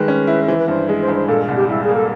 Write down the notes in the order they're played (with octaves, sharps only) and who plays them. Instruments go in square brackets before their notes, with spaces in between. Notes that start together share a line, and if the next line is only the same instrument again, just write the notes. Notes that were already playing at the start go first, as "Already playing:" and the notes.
Already playing: [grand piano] D#3 G3 G#3 [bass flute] B4
[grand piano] C#4
E4
[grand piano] E3 [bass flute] C5
[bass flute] B4
[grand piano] G2 [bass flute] C5
[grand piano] G#3
[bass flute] C5
[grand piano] G2
[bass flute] C5
[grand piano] A#2 [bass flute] A4
[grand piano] C2
[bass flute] G4
[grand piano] G3 [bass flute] E4
[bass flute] G#4
[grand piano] A#3
[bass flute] A4